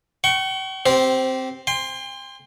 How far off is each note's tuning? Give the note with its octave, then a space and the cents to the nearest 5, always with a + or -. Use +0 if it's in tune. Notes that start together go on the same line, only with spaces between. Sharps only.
G5 -45 C#6 +0
C4 +0 G4 -25 C5 +0
G5 +40 C6 +0